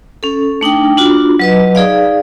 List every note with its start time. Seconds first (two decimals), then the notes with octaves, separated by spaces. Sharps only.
0.23 C#4 A4
0.61 A3 D4 D#4 G5
0.97 D4 F4 F#4
1.39 F#3 B4 D#5
1.75 D#4 G#4 D5 F5